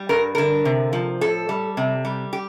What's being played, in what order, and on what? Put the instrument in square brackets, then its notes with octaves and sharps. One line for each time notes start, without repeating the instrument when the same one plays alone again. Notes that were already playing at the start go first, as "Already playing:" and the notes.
Already playing: [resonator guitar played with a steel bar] G3
G2 A#4
D3 A#4
C3
F3
A2 A4
G3
C3
G3
G4